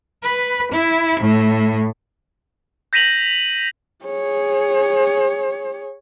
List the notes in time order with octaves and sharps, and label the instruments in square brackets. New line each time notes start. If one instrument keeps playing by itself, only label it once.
[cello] B4
E4
A2
[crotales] G6 A#6 B6 D#7 F7 F#7
[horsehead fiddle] G#4 C#5